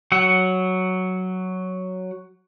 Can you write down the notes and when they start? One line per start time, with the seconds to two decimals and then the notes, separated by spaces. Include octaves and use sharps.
0.12 F#3 F#5